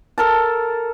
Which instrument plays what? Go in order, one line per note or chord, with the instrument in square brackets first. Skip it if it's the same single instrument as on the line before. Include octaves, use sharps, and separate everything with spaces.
[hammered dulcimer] A4 A#4 A5